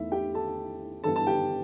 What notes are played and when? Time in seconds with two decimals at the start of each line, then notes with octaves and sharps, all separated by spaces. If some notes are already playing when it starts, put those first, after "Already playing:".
Already playing: E2 D#3 A3 E4 E5
0.12 G4 G5
0.34 A4 A5
1.03 G2 E3 G3 B3 A4 A5
1.16 A5
1.27 G4 G5